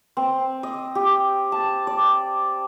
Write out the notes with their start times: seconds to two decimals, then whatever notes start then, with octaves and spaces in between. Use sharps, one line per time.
0.17 C4
0.63 D#5
0.95 G4
1.52 A5
1.87 D5